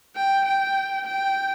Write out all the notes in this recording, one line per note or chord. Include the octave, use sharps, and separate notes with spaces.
G5
G5
G5